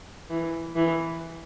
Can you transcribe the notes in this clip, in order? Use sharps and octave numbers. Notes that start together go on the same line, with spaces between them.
E3
E3